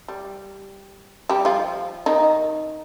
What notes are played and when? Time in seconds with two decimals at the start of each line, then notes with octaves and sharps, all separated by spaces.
0.08 G3
1.29 G3 G4
1.45 F3 F4
2.06 D#3 D#4